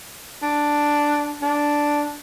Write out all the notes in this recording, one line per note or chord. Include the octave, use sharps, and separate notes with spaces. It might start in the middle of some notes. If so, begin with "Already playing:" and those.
D4
D4